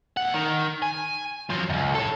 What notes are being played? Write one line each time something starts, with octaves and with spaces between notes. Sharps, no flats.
D#2 F#5
D#3
G#5
F3 F#3
C#2 F#2
A4 C#5